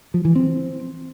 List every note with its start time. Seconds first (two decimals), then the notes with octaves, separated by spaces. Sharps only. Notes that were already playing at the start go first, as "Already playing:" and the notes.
0.14 F3
0.25 E3
0.35 C4